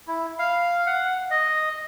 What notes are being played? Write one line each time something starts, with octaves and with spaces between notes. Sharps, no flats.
E4
F5
F#5
D#5